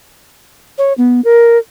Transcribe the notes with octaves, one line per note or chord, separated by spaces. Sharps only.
C#5
B3
A#4